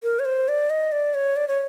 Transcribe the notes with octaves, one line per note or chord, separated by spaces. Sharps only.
A#4
C#5
C5
D5
D#5
D5
C#5
D5
C#5